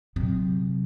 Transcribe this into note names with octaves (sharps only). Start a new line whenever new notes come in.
C3 F#3